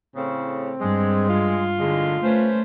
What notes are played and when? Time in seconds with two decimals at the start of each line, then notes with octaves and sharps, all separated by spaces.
0.16 A2 C#3 C4
0.81 G2 G#3
1.29 F4
1.79 A2 D3 G#3
2.23 A3 C#4 B4 C5